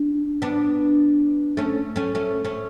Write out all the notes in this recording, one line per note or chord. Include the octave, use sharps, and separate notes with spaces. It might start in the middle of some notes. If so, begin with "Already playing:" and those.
Already playing: D4
B3 D4
A3 C#4
A3 C#4
A3 C#4
A3 C#4